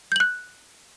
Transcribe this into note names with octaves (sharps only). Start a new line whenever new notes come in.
F#6 G6 F#7